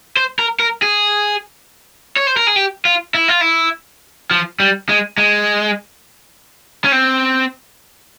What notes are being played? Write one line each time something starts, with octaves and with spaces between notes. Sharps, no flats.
C5
A#4
A#4
G#4
C#5
C5
A#4
G#4
G4
F4
E4
F4
E4
F3
G3
G#3
G#3
C#4
C4